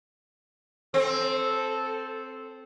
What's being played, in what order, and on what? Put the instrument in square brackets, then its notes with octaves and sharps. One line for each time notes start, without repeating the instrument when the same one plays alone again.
[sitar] C4 [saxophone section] A4